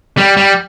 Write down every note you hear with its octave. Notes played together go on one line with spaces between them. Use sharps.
G3
G3